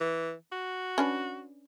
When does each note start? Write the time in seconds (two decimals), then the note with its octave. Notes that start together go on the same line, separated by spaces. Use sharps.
0.01 E3
0.52 F#4
0.98 C#4 D4 B4